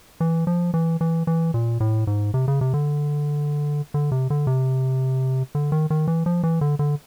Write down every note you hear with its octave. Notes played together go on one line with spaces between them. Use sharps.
E3
F3
E3
E3
E3
A#2
A2
G#2
C3
C#3
C3
D3
D3
C3
D3
C3
D3
D#3
D#3
E3
F3
E3
D3
D3